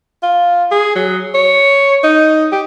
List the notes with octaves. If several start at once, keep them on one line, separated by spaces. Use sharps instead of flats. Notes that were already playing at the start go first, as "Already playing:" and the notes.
F4
G#4
F#3
C#5
D#4
G4